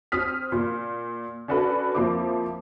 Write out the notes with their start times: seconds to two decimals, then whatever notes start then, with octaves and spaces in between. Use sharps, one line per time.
0.12 C4 D#6 F6 B6
0.52 A#2
1.48 C#4 D4 F#4 A4 B4
1.95 F2 F3 A#3 E4 C5 D6